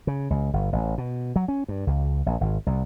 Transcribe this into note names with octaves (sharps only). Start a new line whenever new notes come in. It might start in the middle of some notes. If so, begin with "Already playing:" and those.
C#3
C#2
G1
A1
B2
F#3
C#4
G2
C#2
A#1
G#1
C2